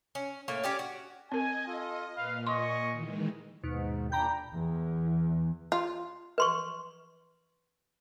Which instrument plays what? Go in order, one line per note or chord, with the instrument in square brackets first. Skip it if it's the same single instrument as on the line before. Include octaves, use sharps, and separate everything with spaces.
[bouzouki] C#4
A2 A#3 C#5
C#4 G4 D5
F#4
[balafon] C4 A#4 [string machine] D#5 [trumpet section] G#5
[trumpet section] F4 A4
[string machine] A#2 [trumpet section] B4 F5
[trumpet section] D#5 G#5 C#6 [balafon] C6
[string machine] D#3 E3 G#3
[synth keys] D#2 B2 [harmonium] G#2
[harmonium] A#2 D4 G5 [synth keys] A#5 B5 G6
[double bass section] E2
[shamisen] F4
[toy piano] B4 C6 C#6